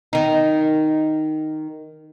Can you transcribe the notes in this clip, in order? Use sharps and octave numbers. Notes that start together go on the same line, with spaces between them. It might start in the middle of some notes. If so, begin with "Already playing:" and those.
D#3 D#4